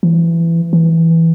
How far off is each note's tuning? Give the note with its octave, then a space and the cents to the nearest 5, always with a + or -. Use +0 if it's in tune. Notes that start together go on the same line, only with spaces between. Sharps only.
E3 +20
E3 -5